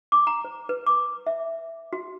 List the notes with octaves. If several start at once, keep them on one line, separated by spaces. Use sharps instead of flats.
D6
A#5
C5
B4
D6
E5
F#4